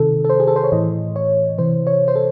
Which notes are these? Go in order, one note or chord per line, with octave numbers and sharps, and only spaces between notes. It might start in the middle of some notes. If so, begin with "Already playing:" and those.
Already playing: C3 D#3 A4
A4
C5
G#4
A4
C5
C#5
A2 E3 D#5
C#5
C3 E3 C5
C#5
C5
A4